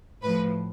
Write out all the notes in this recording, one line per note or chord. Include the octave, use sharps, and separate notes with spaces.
A2 F3 B4